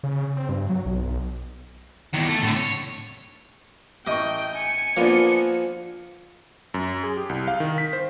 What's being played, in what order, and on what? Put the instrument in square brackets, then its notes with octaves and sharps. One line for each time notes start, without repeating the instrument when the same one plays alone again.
[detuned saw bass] C#3
C4
G2
F#3
B1
[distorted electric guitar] E2 D#3
A3
A2 D3
C#5
[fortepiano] A1 C#6 [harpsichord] D#5 [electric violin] G5
[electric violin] G#5 C#7
[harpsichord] F3 [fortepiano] A#3 B3 D4
[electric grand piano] F#2
G#4
G4
C2
F5
D#3
B6
C5